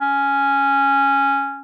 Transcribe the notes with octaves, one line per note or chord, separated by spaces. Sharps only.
C#4